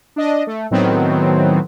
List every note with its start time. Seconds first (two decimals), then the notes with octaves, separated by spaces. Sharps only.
0.16 D4 D#5
0.47 A3
0.71 A2 D#3 F#3 B3 C4